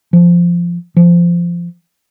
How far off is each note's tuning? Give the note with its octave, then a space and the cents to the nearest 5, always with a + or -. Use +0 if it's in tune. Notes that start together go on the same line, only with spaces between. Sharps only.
F3 -10
F3 -20